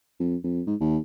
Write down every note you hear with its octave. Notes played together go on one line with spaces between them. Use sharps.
F2
F2
G#2
D#2